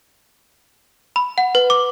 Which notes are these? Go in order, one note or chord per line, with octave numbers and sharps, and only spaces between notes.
B5
F#5
B4
D6